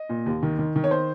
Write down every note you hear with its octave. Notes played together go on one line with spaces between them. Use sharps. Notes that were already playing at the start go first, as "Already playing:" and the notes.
Already playing: D#5
A#2
D#2
D#3
D#3
D#3
C#5
C5